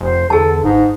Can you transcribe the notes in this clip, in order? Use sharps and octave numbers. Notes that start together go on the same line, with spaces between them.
F1 C5
E2 D3 G#4 A4 A5
G1 G#2 D#4